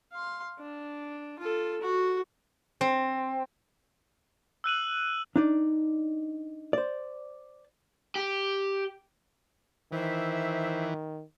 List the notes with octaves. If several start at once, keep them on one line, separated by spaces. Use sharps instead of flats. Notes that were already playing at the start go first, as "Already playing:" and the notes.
F5 C6
D4
F4 A4
F#4
C4
E6 F#6 D#7 F#7
D4 D#4 D5
C5 D5
G4
D#3 E3 C5 E5